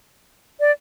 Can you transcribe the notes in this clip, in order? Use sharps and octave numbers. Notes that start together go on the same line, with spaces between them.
D5